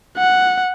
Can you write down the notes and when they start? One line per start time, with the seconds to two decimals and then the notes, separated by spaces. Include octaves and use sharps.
0.18 F#5